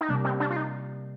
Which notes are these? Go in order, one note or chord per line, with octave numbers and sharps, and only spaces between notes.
D#4
C3 G3 A#3 D4
C4
D4
F4
D#4